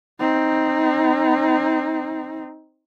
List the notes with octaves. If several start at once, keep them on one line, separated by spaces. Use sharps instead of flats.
C4 D#4